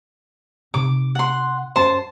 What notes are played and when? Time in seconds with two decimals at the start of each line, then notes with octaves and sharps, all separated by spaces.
0.74 C3 D#4 D6
1.15 F#5 C6
1.76 F#2 C5 A5